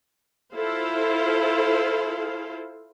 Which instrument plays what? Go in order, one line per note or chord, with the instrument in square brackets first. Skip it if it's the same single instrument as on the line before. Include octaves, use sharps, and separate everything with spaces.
[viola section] E4 F4 A4 C5 F5